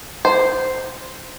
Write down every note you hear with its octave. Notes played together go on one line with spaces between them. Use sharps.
C5